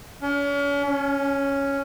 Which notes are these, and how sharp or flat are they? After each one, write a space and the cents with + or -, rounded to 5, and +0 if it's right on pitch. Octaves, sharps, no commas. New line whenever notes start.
C#4 +40
C#4 +0